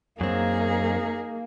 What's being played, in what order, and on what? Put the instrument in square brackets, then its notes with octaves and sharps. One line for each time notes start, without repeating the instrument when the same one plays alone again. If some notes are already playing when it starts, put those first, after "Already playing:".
[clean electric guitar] F#2 C4 [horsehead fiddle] A#3 [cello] D#4 G#4